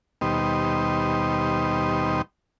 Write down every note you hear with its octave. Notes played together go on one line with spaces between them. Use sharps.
D#2 B2 G3 D#4 C5